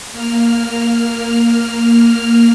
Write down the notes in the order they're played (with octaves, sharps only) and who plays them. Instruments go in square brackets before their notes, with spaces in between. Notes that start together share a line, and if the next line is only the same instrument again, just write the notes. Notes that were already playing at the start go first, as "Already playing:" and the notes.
[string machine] A#3 F6